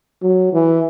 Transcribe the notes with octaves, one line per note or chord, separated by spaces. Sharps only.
F#3
E3